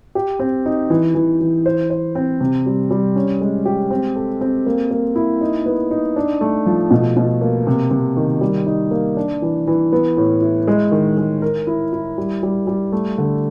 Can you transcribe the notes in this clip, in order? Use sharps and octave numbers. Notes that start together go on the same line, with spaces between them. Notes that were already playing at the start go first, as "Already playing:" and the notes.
G4
C4
D#4
E3
E3
E3
C5
C5
C4
C3
G3
G3
C#4
G#3
G4
C4
A4
C4
A#3
A#3
E4
D#4
B3
D#4
D4
A3
F3
B2
B2
A#3
C3
C3
D#3
G3
D#4
A#3
D4
E3
E3
B3
A2
E4
G#3
D#3
G#3
A#4
E4
E4
G3
G3
G3
A3
D3